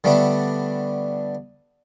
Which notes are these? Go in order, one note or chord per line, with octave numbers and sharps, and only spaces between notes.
D3 G3 A3 B3 D4